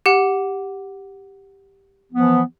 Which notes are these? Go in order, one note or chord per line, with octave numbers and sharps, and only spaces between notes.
G4 F#5
E3 F3 B3